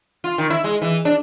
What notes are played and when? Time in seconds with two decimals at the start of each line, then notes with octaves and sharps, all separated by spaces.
0.24 F4
0.38 D#3
0.50 E4
0.64 G#3
0.82 E3
1.05 D4